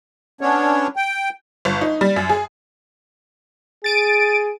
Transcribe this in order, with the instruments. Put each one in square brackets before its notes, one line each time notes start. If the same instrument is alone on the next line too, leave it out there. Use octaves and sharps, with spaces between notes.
[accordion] B3 C#4 D4 C#5
G5
[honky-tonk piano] G1
D#4
G3
F#2
G#4
[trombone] G#4 [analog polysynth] A6 D7 D#7